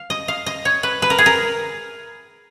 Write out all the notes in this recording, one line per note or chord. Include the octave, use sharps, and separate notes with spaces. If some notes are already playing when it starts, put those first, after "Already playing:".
Already playing: F5
D#5
F5
D#5
C#5
B4
B4
A#4
G#4
A#4